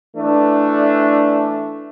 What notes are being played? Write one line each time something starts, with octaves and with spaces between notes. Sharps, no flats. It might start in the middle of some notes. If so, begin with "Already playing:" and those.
E3 A3 D4